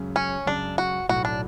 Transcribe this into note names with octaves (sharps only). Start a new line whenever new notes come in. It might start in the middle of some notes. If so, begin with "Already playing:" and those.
Already playing: F#2 C#3 G#3
C#4
F#2 C#3 G#3 D4
F#4
B1 A2 F#3 F#4
D4